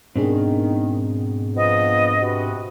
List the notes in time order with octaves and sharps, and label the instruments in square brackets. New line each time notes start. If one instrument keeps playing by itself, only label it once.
[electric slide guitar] G#2 B2 [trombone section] D#3 [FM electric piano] C4 D4 G#4
[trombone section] F3 B3 [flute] D#5
[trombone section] C3 F#4 B4